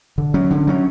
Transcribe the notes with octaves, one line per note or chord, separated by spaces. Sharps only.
D3
F#3 C#4
D3
F#3 C#4